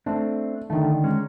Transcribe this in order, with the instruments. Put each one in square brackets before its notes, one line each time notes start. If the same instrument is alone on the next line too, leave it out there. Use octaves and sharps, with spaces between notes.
[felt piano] A3 [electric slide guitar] C4 D4
[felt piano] D3 D#3 [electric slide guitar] A3
[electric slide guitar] G#3 C#4